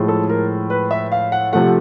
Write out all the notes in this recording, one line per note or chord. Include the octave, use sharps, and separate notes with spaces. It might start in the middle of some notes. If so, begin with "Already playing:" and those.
Already playing: A2 F3 G#3
A4
A#4
B4
E5
F5
F#5
C3 F3 A3 F#5